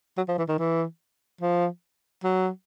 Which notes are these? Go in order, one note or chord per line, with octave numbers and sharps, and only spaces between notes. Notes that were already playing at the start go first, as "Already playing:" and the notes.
F#3
F3
E3
D#3
E3
F3
F#3